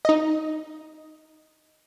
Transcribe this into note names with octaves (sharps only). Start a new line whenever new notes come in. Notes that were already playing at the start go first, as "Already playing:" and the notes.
D#4 D#5